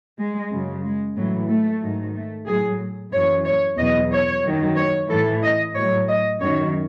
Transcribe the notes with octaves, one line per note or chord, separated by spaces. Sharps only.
G#3
F#2 C#3 F#3
G#3
A2 E3 F#3
A3
G#2 D#3 F#3
A3
A2 F#3 G#4
F#2 E3 C#5
C#5
E2 B2 F#3 D#5
C#5
F#2 D#3 F#3
C#5
A2 E3 A4
D#5
A2 F#3 C#5
D#5
F#2 D#3 F#3 C#5